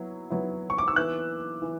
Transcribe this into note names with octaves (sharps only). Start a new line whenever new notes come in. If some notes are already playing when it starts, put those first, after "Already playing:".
Already playing: F#3 B3 E4
F#3 B3 E4
C#6
D6
E6
E3 B3 E4 F#6
E3